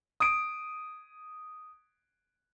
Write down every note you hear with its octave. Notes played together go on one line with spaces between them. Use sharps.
D#6 D7